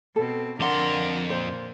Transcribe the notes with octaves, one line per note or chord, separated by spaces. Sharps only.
B2 C4 A4
F2 D3 D4 A#4 F#5 C6
A#2 C5